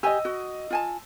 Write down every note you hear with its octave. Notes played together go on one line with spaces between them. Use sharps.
G4 D#5 G#5 E6
F#4
F4 G#5 A5